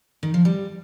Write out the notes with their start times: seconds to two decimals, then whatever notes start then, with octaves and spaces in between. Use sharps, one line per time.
0.23 D#3
0.34 F3
0.45 G3